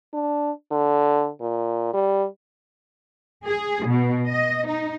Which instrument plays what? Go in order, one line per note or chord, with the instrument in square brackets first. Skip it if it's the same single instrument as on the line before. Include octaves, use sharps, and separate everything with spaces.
[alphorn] D4
D3
A#2
G3
[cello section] G#4
B2
D#5
D#4